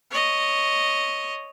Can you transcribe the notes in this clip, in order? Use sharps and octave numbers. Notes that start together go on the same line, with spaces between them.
C#5 D#5